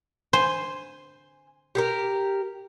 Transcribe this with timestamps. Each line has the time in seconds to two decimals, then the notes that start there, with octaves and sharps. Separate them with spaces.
0.33 C5 G#5
1.75 G4 G#4 A#4